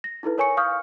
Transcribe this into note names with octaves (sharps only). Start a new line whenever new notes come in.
A#6
D#4 E4 A4 B4
A#4 C#5 G#5 C#6 C#7
F5 C#6 D#6 F6 G6